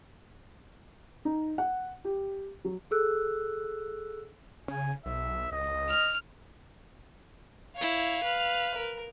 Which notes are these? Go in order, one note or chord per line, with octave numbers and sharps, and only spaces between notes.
D#4
F#5
G4
F#3
G#4 A4 E6 F#6
C#3 G#5
B1 E5
C#2 D#5
F6
E4 C#5 F5
B4 F6
A#4